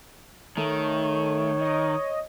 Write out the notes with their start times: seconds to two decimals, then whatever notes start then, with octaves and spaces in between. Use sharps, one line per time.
0.57 D#3 A3 C#5
1.61 D#5